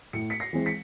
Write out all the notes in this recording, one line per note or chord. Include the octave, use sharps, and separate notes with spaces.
A2 C#7
B6 C#7
A#6 C7
E3 G#3 C4
B6 C#7